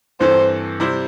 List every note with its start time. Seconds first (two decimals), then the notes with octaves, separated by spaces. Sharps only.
0.20 G2 E3 C4 A4 C5
0.80 C3 G3 E4 C5